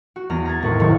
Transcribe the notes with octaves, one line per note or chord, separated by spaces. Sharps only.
F#4
E2 B3 A#5
A#5 G#6 A6
G#1 A2 B4 C#6
F#1 A2 C3 D#3 C#5 C#7